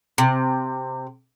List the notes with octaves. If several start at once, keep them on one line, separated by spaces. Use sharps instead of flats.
C3